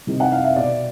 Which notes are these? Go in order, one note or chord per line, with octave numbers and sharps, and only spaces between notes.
C3 D#3
F#5
F5
E5
B2 D5